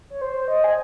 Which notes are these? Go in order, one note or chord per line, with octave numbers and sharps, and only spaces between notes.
C#5
C5
D#5
G#5